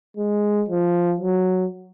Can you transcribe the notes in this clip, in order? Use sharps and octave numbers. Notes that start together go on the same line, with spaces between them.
G#3
F3
F#3